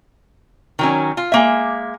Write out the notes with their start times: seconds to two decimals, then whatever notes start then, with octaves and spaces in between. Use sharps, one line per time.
0.79 D#3 F#3 C#4
1.17 F4
1.32 G#3 A#3 E5